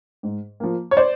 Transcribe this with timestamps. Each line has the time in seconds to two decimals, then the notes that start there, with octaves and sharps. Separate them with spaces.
0.23 G#2
0.60 F3 A#3
0.91 C#5
0.97 C5 D5